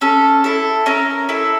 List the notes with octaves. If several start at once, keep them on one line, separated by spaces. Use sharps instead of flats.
C#4 A4
E4 A4
C#4 A#4
E4 A4